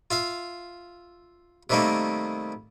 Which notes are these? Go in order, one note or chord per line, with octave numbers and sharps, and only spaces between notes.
F4 E5 F5
C3 D#3 G3 A3 A#3 D#4